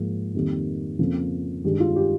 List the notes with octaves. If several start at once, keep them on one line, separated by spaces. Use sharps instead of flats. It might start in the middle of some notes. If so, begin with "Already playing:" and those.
Already playing: G#2 F3 A#3
F2 D#3 G3 A#3
F2 C#3 F3 A#3
G2 D#3 G#3 G4
F4
G4